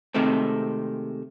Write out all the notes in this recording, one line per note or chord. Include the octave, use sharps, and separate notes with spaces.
C3 D#3 G#3 A3 C4